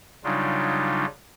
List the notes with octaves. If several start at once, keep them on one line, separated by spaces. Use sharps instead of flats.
C#3 F#3 G3 D4 D#4 F4